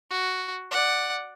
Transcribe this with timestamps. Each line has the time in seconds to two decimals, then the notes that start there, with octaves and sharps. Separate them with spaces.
0.10 F#4
0.71 D5 F#5